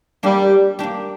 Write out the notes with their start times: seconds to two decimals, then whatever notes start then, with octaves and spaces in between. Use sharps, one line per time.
0.23 G3 A#3 D4 G4
0.79 A#3 D4 G4